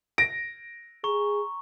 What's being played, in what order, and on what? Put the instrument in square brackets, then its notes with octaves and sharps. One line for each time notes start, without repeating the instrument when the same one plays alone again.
[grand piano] A#6 D7
[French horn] G#4 [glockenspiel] A#5 C#6